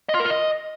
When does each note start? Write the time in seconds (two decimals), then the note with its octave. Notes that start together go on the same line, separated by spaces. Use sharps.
0.09 D#5
0.14 F4
0.20 A#4
0.25 F4
0.30 D#5